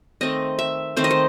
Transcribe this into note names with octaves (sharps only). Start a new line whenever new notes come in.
D#3 A3 C4 D#5
E5
D#3 A3 C4 C5
D#5
C5